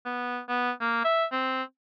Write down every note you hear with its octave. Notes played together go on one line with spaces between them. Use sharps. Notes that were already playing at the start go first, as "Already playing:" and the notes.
B3
B3
A#3
E5
C4